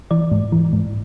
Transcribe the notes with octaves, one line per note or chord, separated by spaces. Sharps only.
E3 D5
G#2
E3
G#2